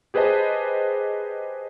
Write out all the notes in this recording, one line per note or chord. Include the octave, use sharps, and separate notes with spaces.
G4 G#4 B4 C5 D#5 A5